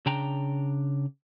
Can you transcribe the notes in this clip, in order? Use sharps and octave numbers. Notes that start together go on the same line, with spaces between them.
C#3 D4 G5 A#5